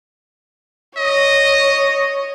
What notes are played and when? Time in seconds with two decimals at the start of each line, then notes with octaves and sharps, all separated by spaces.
0.97 C#5 D#5